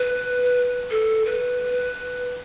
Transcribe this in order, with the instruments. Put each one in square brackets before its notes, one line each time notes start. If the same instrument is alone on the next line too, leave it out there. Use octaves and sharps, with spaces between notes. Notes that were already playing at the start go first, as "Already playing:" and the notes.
Already playing: [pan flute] B4
A4
B4